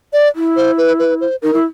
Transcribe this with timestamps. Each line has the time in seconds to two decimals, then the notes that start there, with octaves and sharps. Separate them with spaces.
0.13 D5
0.35 E4
0.56 C5
0.78 B4
0.99 B4
1.21 C5
1.42 D#4 A#4
1.53 E4